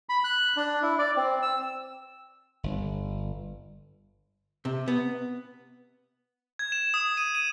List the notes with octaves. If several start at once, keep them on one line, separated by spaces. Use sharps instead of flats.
B5
F#6
D4
E4
D5
C4
E6
G1
C3
B3
G#6
E7
D#6
D#7
D#7